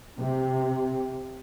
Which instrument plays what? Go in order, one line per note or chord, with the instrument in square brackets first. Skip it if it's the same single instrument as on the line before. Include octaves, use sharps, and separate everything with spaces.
[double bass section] C3